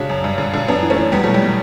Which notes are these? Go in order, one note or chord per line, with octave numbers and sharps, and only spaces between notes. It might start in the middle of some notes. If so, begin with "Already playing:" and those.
Already playing: C#3 D4 F#4
F#2
G2
D3
D3
F#2 B3 D4
E3
A3 C#4
E3
E2 G3 B3
B2 F#3 A3
G3
B2